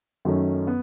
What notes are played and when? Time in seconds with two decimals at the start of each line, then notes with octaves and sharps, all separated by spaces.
0.25 F#2 D#3 F#3 A3 C#4
0.67 B3